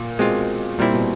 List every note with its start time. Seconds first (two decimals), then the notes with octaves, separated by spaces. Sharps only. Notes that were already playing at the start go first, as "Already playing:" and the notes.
Already playing: A#2
0.19 B2 G#3 C4 F4
0.79 A#2 G3 C4 E4
0.94 B2